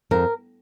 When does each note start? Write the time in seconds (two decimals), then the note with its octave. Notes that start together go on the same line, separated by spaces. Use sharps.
0.11 F2 A#4